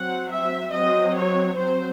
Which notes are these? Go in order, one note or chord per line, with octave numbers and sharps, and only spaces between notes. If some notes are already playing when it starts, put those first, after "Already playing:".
Already playing: F#3 C4 F#5
E5
F#3 C4 D#5
C#5
F#3 C4 C5